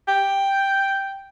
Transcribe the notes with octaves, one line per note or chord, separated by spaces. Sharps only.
G5